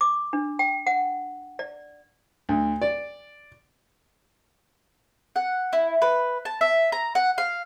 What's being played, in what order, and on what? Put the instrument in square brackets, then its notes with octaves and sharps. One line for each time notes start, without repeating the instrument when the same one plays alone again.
[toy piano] D6
D4
G5
F#5
D5
[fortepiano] D2
D5
[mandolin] F#5
E4
B4
A5
E5
A#5
F#5
F5